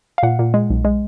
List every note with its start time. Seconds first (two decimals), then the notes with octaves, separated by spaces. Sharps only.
0.18 F5
0.23 A#2 F#5
0.39 A#2
0.54 G#3
0.70 B1
0.85 G#3